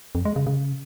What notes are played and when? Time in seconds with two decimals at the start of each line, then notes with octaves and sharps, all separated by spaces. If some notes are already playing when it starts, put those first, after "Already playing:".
0.15 F2
0.25 G#3
0.36 C#3
0.47 C#3